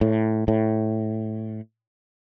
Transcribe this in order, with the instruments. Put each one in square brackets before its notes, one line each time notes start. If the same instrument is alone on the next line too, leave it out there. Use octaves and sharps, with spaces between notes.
[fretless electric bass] A2
A2